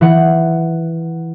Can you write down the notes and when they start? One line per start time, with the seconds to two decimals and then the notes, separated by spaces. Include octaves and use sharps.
0.01 E3 F#5